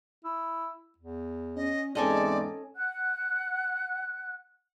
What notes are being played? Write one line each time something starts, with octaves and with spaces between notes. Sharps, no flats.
E4
E2
C#4 D#5
E2 G#2 C4 C#4 A4 D5 D#5
F#5 F#6